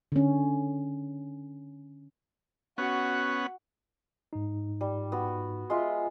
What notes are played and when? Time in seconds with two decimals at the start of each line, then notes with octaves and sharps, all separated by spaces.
0.12 D3 C#4
2.78 B3 C#4 F#4 F#5
4.33 G#2 D#4
4.81 G3
5.12 B3 F#4
5.70 G#3 F4 E5 C6